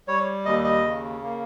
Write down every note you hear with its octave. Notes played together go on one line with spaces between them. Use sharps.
G3 C#5
D#2 D#5
D#5
C#3
A#3